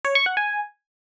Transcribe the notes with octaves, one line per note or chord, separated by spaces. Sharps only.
C#5
C#6
F#5
G#5